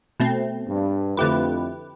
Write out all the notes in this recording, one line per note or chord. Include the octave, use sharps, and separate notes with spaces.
B2 A3 C4
G2
F2 D3 A3 E4 G4 B4